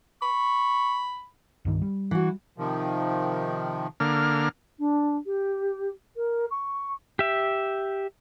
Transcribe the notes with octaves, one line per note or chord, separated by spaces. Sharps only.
B5 C#6
C2 G2 D#3
G3
E3 F#4
C3 D#3 F3
D3 A#3 F6
D4
G4
A#4
C#6
G4 E5